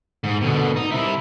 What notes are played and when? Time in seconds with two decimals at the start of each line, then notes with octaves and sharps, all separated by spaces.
0.24 G#2
0.41 B2 D3
0.76 D#4
0.92 C3 E4